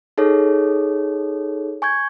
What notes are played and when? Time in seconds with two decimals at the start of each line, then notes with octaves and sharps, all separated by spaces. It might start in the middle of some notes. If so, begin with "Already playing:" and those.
0.18 D#4 G#4 A4 C#5
1.82 G#5 C#6 G6 G#6